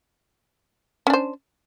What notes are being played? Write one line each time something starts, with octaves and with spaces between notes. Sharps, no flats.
C#4 D4 C5